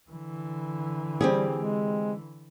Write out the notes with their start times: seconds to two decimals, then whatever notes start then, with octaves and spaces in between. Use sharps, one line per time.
0.11 D3 E3
1.21 G3 C4 G4 G#4
1.55 G#3